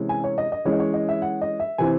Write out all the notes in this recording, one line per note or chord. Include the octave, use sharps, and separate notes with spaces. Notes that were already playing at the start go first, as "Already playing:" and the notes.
Already playing: C3 E3 G#3 C#4
G#5
C#5
D#5
D#5
E3 G#3 C#4 C#5
D#5
C#5
D#5
E5
F#5
D#5
E5
C3 E3 C4 G#5